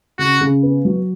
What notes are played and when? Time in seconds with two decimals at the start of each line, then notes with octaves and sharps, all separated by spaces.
0.19 C#3 F#4
0.41 C#3
0.63 B3
0.85 F#3